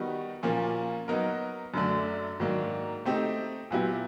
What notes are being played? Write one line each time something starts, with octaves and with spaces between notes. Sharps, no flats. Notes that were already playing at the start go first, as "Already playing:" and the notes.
Already playing: D#3 G3 B3 D#4 F#4
A#2 F3 A#3 C#4
F#3 B3 D#4 F#4 A#4
F#2 D3 F#3 A3 D4
G#2 D#3 F#3 A#3 D4
A3 C4 D#4 G4
A#2 F#3 B3 E4 G4